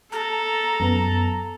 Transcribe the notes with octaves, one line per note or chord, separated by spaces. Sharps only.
A4 A#5
F#2 B3